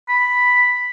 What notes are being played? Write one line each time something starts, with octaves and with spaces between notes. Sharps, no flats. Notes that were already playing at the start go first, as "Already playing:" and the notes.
B5